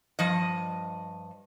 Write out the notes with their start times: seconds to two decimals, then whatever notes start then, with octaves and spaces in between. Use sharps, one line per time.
0.19 G2 F3 D#5